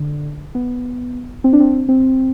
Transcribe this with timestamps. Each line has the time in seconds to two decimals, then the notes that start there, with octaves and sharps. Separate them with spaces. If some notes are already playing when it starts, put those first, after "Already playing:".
Already playing: D3
0.55 B3
1.44 C4
1.53 D4
1.60 C4
1.89 C4